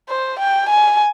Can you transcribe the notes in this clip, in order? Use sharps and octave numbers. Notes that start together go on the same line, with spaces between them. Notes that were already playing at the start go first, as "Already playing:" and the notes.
C5
G5
G#5